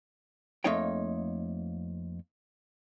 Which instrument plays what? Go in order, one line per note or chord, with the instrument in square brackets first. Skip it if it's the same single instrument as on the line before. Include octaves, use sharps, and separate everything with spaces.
[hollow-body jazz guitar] F2 A3 A#3 D#4 C#5 G5